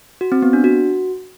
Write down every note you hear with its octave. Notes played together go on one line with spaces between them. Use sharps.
F#4
C4
B3
D4
F#4